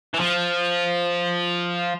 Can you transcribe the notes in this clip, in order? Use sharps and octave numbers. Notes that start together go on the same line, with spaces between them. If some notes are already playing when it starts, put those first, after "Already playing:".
E3
F3